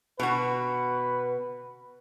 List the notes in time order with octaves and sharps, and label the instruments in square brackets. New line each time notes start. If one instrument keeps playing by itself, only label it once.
[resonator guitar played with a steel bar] B2 F#4 [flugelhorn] B4